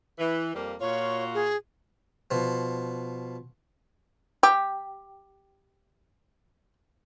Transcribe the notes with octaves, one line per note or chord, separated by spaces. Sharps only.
E3
F2 G3 A#3
A#2 F4 F#4 C#5
G#4
B2 F3
G4 D6